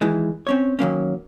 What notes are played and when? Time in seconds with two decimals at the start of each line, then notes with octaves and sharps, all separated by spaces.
0.01 D#3 E3 G#3
0.47 C4 C#4 C#5
0.79 D#3 F#3 A#3 C#4